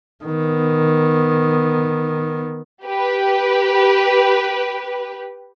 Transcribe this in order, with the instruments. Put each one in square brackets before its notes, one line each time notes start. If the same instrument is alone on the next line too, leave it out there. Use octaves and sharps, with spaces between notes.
[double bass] D#3 B3
[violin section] G4 B4